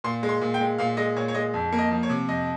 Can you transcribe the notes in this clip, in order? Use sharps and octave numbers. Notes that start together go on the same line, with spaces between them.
A#2 C6
G#3
C6
A#2
G5
G#3
A#2 F5
G#3 D#5
A#2 C#5
C#5
G#3 D#5
F2
A#3
D#5
F3
C#5
C3
F2 D#5